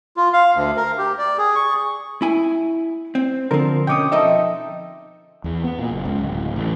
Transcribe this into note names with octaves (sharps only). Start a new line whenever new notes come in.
F4
F5
D2
A#4
G4
D5
G#4
C#6
E4 G#5
C4
D3 F3 C4 A#4
B2 C#4 G5 D6 D#6
F3 D#4 A4 D#5 E5
E2
B3
A#2
F#1
C#2
D1
A1